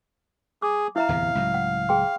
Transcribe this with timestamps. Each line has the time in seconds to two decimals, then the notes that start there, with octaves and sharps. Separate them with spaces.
0.62 G#4 D6
0.96 E4 E5 F5 A#5
1.09 D1 E2 C3
1.35 C#2 A2 F#3
1.54 F#5
1.89 G#4 G5 C6